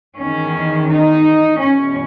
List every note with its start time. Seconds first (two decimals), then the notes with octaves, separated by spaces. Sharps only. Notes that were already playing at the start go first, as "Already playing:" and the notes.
0.17 E2 D#3 C#4
0.89 D#4
1.59 E2 B2 C#4